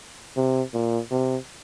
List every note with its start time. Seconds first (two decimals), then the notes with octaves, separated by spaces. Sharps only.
0.37 C3
0.74 A#2
1.11 C3